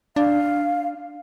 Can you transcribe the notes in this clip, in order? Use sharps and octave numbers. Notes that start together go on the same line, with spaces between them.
D4 F5